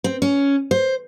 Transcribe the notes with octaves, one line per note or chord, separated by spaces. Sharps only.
C4
C#4
C5